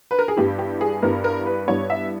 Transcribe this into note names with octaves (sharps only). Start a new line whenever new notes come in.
B4
A#4
G#4
G2 G3 B3 E4 G4
G4
G#4
G2 G3 B3 E4 A#4
A#4
B4
G2 G3 B3 E4 C#5
E5